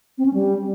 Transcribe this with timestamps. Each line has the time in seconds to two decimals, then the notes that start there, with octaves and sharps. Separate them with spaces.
0.18 C4
0.26 C#4
0.34 G3